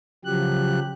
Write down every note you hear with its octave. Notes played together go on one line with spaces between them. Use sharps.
C#3 F3 F#3 G4 F#6